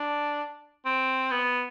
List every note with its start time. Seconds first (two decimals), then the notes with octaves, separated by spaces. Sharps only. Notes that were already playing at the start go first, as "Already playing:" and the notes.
Already playing: D4
0.85 C4
1.31 B3